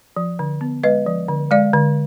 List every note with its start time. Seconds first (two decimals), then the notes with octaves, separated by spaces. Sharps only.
0.16 F3
0.39 D3
0.61 B3
0.84 G#3 B4 D#5
1.06 F3
1.29 D3
1.51 G#3 D5 F5
1.74 D3